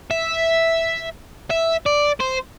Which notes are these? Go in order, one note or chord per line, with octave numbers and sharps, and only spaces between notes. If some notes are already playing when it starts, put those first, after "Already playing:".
E5
E5
D5
C5